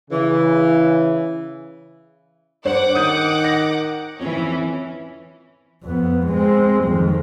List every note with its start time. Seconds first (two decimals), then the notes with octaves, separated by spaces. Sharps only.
0.11 C#3 E3
2.65 G2 C5 C#5 F#5 D6
2.95 D#3 D#6 G6
3.44 A#6
4.20 F2 E3 C#4
5.84 F2 B3
6.27 G#3 C4
6.85 F2 D#3